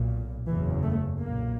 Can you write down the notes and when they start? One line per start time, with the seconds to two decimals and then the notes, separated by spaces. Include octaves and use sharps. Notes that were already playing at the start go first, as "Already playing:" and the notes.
Already playing: B1 A#2
0.47 F#1 E2 C#3 E3
0.83 A3
1.20 B1 A#2 A#3